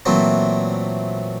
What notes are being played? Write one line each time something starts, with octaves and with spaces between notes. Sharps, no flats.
A#2 E3 F#3 A3 C4